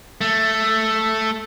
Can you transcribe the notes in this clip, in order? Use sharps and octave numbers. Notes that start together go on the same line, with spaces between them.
A3